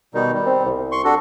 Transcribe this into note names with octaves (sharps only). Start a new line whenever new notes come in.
B2 D#3 G3 D#4
G3
C4
C2
C6 C#6
D4 F#4 A4